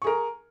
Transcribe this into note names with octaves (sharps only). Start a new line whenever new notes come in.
G#4 A#4 C#6